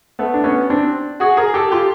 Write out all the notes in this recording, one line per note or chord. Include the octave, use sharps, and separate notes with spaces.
A3 B3
D4
B3 C#4
C4 D4
F#4 G#4
G#4 A#4
G4 A4
F4 G4